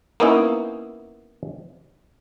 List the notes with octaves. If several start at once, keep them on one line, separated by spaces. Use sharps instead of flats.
A#3 B3 C#4 D#4 E4